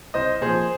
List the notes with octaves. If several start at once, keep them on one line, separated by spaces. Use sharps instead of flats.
C2 C5 D#5
A#2 F3 G#4 C5